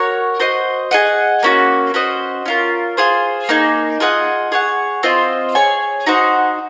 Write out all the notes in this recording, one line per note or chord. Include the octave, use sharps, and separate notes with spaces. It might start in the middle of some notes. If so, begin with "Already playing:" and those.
Already playing: F#4 A#4 C#5 F#5
F#4 C5 D#5
G#4 D#5 F#5
A#3 C#4 F#4
C#4 F#4 C5 D#5
C#4 F4 A#4
F4 G#4 C5
A#3 D#4 G#4
F4 G#4 D#5 F#5
G#4 C#5 F#5
C4 F4 C5 D#5
G#4 C#5 G#5
D#4 F#4 C5 F#5